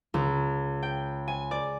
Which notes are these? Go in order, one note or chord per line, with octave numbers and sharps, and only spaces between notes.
C#2
G5
G#5
D5